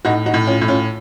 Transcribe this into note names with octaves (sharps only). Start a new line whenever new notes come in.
A2 D#4 F#4
D#4 F#4
A2
C#4 F4
A2
C#4 F4